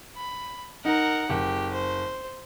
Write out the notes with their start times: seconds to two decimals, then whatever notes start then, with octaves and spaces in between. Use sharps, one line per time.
0.16 B5
0.85 D#4 A#4 F#5
1.30 F#1 G4
1.73 C5